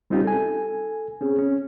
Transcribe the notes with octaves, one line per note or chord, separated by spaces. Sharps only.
G3 C4 C#4 D#4 F4 G4
A4 G#5
C4 C#4 G#4
C#4